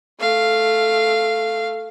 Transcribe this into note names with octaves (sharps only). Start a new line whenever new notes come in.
A3 F5